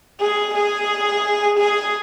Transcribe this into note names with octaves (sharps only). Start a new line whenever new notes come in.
G#4
G#4
G#4